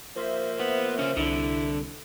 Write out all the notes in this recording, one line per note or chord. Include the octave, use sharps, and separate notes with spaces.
F3 A#3 C5 E5
B3
C#3 C#4
C2 D3 E4